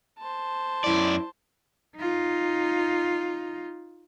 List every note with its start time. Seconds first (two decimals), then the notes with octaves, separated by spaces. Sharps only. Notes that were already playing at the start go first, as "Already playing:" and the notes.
0.19 C5 A5
0.84 F#2 E4 D5
1.97 D#4 F4